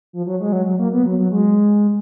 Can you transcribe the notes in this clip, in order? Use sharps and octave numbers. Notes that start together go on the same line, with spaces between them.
F3
F#3
G#3
F#3
F#3
A#3
B3
F#3
F#3
G#3